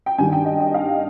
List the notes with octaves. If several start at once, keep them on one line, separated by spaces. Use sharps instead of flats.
G5
G2 D#3 G3 G#5
G5
D#5
D#5
F5